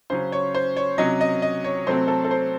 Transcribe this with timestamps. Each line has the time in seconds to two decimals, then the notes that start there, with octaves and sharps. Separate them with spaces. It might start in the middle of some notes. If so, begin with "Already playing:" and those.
0.10 C#3 F#3 C#4 C5
0.32 C#5
0.55 C5
0.76 C#5
0.98 C3 F#3 C#4 D#5
1.21 D#5
1.42 D#5
1.64 C#5
1.87 C3 F#3 A3 C4 C5
2.08 A4
2.24 A4
2.31 C5